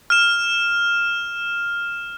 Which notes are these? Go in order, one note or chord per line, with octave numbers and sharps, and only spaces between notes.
F6 E7